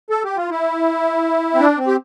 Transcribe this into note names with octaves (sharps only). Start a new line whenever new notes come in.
A4
G4
F4
E4
C4
D4
C4
G4